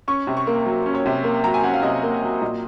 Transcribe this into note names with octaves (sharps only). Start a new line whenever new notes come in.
C#4 C#6
C3
C#6
A#3
F#3
C#4
C#5
C3
A#3
F#3 A#5
G#5
C#4 F#5
F5
C3 D#5
A#3
F#3
A#2 D#5